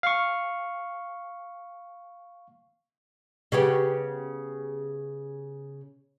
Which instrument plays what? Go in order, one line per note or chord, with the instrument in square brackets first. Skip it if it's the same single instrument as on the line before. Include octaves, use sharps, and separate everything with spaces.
[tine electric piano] F5 C#6
[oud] C#3 B3 G4